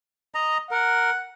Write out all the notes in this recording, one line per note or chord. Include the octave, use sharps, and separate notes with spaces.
D#5 A#5
A#4 F#5